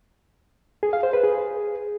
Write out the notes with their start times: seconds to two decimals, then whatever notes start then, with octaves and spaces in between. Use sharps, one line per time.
0.83 G#4
0.93 F5
1.03 C5
1.13 B4
1.24 G#4